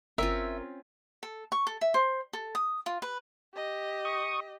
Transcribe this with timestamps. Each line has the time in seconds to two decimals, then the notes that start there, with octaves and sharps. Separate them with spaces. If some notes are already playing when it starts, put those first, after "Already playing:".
0.18 G1 C4 C#4 F4 A#4 E5
1.23 A4
1.52 C#6
1.67 A4
1.81 E5
1.94 C5
2.33 A4
2.55 D#6
2.86 F4
3.02 B4
3.54 G4 D#5
4.05 C#6 D#6